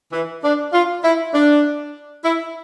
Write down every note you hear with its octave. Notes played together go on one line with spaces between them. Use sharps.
E3
D4
F4
E4
D4
E4